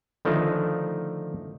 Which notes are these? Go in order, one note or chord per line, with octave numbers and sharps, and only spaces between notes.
D3 D#3 F3 A3 D#4